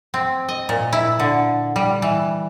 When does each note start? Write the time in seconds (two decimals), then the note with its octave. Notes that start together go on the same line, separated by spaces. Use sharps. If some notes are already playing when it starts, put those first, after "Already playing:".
0.14 C4
0.49 D#5
0.69 A#2
0.93 E4
1.20 D3
1.76 G3
2.02 E3